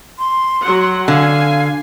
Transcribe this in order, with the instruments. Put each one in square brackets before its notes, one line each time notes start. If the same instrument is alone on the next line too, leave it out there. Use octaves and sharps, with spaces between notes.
[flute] C6
[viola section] F#3 F#5
[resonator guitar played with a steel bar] D3 [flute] F5 [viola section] G#5